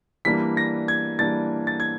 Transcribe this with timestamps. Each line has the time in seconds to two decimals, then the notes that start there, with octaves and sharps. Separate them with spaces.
0.25 E3 G3 A#3 D4 B6
0.57 A#6
0.88 G#6
1.19 E3 G3 A#3 D4 A6
1.67 A6
1.80 G#6